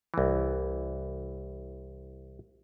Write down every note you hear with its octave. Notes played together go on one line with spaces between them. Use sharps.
C2 E3